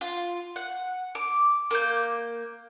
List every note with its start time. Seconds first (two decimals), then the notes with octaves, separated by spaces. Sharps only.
0.01 F4
0.56 F#5
1.15 D6
1.71 A#3 G6